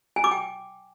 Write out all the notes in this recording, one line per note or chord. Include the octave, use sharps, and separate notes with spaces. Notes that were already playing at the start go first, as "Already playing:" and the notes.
G#5
D6
G5